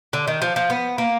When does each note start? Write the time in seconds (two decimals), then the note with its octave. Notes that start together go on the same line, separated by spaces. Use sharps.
0.13 D3
0.27 D#3
0.42 F3
0.56 F3
0.70 B3
0.98 A#3